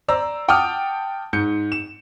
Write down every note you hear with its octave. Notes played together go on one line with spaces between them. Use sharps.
C5 D5 A#5 E6
F#5 G5 A5 D6 D#6 F6
G#2 G6 C#7
E7